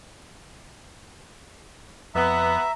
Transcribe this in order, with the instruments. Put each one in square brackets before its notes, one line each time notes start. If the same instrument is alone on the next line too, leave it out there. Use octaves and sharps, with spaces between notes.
[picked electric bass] F2 [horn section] B3 [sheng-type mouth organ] E5 [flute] A#5